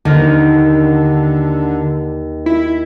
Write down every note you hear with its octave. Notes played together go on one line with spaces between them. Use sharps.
D#2 D3 A#4
E4